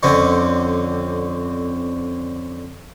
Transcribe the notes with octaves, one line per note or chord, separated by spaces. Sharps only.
F2 D3 C4 C#4